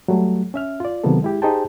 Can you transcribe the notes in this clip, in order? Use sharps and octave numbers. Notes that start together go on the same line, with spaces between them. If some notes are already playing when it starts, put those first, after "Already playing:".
F#3 G3 A3
C#4 E5 F6
F4 D5
C3 D#3 F#3 A#3 B3 A4
G#3 E4 G4
D#4 G4 G#4 C5 G5 A5